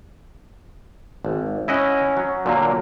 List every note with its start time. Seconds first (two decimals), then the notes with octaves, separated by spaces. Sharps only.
1.25 G#1
1.68 C#4 E4 D#5 F#5
2.17 F#3
2.46 A#2 D3 F#3 A#3